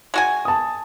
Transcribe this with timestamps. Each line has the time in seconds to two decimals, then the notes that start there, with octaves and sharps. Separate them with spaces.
0.14 G#3 F#4 G#5
0.45 A5 D#6